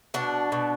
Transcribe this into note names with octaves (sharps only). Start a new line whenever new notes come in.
B2 D4
B2